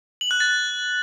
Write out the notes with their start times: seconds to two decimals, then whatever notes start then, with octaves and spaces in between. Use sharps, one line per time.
0.21 F#7
0.31 F#6
0.40 A6